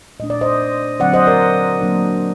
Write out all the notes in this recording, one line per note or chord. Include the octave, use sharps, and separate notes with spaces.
A#2 A3 D4 D#5
D5
C5 D#5
D3 F#3 C4 D5 F#5
C5 D#5
A#4 D5
F#3 A#3 D4